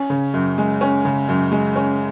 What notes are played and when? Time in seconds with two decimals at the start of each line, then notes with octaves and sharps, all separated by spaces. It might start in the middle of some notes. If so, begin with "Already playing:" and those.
Already playing: C#4
0.10 C#3
0.34 F#2
0.58 G#3
0.81 C#4
1.05 C#3
1.29 F#2
1.52 G#3
1.76 C#4